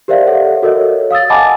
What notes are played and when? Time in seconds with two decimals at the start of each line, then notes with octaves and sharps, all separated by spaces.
0.08 G4 A#4 C5 D5 E5 F5
0.27 A4 C#5 E5 F#5
0.62 F#4 A4 A#4 C#5 D#5
1.11 F5 D#6 E6 A6
1.30 D#5 F#5 G#5 A5 B5 D6